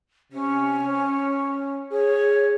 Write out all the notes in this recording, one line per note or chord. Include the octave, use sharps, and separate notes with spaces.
C3 C#4
C#5
G#4 C#5